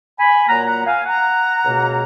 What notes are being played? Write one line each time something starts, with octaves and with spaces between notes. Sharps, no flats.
G#5 B5
A#2 F#3 A#3 F#5 A#5
F#5 A#5
F5 G#5
F#5 A#5
C#2 B2 A#3